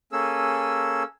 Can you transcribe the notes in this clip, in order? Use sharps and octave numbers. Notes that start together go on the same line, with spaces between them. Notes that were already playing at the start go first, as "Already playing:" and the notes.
A#3 C#4 G#4 A4 E6